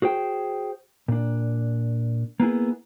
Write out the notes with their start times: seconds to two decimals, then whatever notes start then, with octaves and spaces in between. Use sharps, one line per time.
0.02 F#4 G#4 C5 G5
1.08 A#2 D4
2.40 A#3 B3 E4 G#4